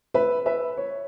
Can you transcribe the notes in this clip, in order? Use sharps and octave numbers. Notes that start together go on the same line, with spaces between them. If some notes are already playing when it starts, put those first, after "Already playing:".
B4 E5
B4 E5
C#5